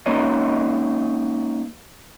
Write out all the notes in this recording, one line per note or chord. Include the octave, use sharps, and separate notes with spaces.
G#3 A#3 C#4 D#4 C#5 D#5